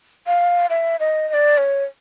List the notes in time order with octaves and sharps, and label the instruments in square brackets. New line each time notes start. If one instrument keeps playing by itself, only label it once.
[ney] F5
E5
D#5
D#5
D5
C#5